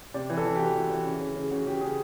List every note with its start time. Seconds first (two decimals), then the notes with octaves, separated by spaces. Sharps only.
0.14 C3 D5
0.30 E3
0.37 A4
0.45 E3
0.55 G4
0.59 E3 F#4
0.76 E3
0.90 E3
1.06 C#3
1.21 C#3
1.36 C#3
1.51 C#3 F#4
1.66 C#3 G4
1.81 C#3 G#4